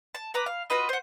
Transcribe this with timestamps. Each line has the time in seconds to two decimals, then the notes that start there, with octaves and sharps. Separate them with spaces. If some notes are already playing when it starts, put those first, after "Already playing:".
0.15 A5
0.34 B4 A#5 D6
0.46 F5
0.70 F4 F#4 B4 D#5
0.89 C5 F#5